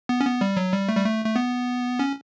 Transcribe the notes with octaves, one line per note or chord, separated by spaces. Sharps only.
B3
C#4
B3
G3
F#3
G3
A3
G3
A3
A3
B3
C#4